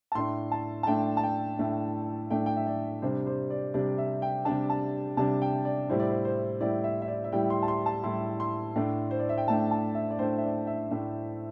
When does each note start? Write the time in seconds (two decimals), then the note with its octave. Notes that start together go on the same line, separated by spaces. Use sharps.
0.12 A5
0.15 A2 A3 D4 C6
0.52 A5
0.83 A5
0.87 A2 A3 D4 G5
1.17 A5
1.23 G5
1.59 A2 A3 D4
2.30 A2 A3 D4 G5
2.46 G5
2.56 E5
2.67 D5
3.02 C3 G3 D4 C5
3.27 C5
3.50 D5
3.74 C3 G3 D4 D5
3.98 E5
4.22 G5
4.45 C3 G3 D4 A5
4.70 A5
5.17 C3 G3 D4 A5
5.42 G5
5.65 D5
5.89 A2 G3 E4 C5
6.00 D5
6.10 C5
6.25 C5
6.61 A2 G3 E4 D5
6.84 E5
7.02 E5
7.08 D5
7.24 E5
7.32 A2 G3 E4 G5
7.50 C6
7.63 A5
7.68 C6
7.86 A5
8.03 A2 G3 E4 C6
8.40 C6
8.76 A2 A3 D4
9.11 C5
9.19 D5
9.29 E5
9.38 G5
9.47 A2 A3 D4 A5
9.71 A5
9.95 E5
10.11 D5
10.19 A2 A3 D4 C5
10.38 E5
10.43 D5
10.67 E5
10.91 A2 A3 D4